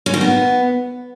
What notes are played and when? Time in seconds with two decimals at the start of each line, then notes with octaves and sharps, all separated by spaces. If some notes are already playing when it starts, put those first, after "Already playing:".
0.06 C#4
0.14 D#3
0.21 B3